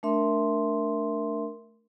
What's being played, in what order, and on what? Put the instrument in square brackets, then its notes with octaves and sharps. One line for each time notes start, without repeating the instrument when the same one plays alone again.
[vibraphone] A3 D4 A#4 E5 C6